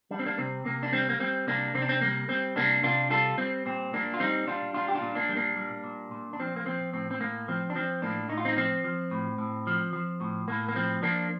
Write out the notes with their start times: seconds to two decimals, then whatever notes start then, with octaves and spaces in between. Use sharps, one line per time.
0.11 G3 D4
0.19 C4
0.26 A#3 D4
0.38 C3 C4
0.65 C3 A#3
0.83 D4
0.93 G3 C4
1.09 A#3
1.20 G3 C4
1.47 C3 A#3 D4
1.75 C3 C4
1.82 D4
1.89 C4
2.01 G3 A#3
2.29 G3 C4
2.56 C3 A#3 D4
2.83 C3 D4 F4
3.11 G3 F4 A4
3.38 G3 C4
3.66 A#2 C4
3.93 A#2 A#3 D4
4.14 F4
4.20 G3 C4 D#4
4.47 G3 D4 F4
4.74 A#2 D4 F4
4.88 G4
4.95 D4 F4
5.02 A#2
5.15 A#3 D4
5.29 G3
5.36 A#3 D4
5.57 G3
5.84 A#2
6.11 A#2
6.33 D4
6.39 F3 C4
6.56 A#3
6.66 F3 C4
6.93 A2 C4
7.11 C4
7.20 A2 A#3
7.48 F3 C4
7.70 D4
7.76 F3 C4
8.02 A2 A#3 D4
8.29 A2 D#4
8.37 F4
8.45 C4 D#4
8.57 F3 C4
8.84 F3
9.11 A2
9.38 A2
9.67 F3
9.93 F3
10.21 A2
10.48 A2 A#3
10.69 A#3
10.76 F3 C4
11.02 F3 A#3 D4